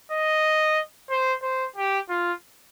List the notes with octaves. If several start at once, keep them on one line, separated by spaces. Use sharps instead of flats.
D#5
C5
C5
G4
F4